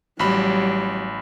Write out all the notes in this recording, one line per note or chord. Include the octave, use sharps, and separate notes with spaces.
A1 F#3 G3 B5